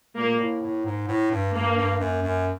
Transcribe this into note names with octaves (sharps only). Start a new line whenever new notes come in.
A#2 A#3
A2
A2
G#2
A2
G2
G2 A#3
G2
F#2
F#2